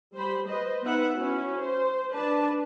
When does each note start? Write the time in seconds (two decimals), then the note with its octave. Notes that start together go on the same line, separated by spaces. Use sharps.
0.15 G3 C5 B5
0.48 B4 C5 D#5
0.83 B3 D#4 B4 E5 F#5
1.14 C#4 E4 F#4
1.59 C5
2.12 D4 B4 A5